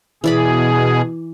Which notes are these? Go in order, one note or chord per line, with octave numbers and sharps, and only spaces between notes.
B2 E3 G#4 D5 B5